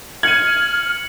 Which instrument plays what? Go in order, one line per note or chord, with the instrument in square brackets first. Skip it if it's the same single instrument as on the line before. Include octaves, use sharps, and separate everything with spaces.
[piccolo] F6 [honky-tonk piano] G#6 D#7 [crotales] C#7 F#7